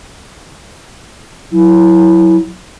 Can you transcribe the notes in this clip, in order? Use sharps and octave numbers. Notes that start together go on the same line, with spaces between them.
F#3 E4